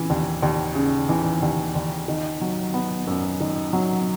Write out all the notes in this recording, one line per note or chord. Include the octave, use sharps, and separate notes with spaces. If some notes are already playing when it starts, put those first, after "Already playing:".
Already playing: C#3 E3
D#2
D#2
C#3
E3
D#2
D#2
D#3
F#3
B3
F#2
D#3
F#3